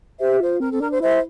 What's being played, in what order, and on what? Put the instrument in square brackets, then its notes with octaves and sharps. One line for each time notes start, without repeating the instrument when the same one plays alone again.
[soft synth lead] G4 [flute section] C5 E5
[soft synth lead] F4 [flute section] C5
[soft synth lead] C4 [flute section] A#4
[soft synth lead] C4 [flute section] A4
[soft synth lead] D4 [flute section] A#4
[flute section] C5
[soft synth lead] E4 [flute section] C5 E5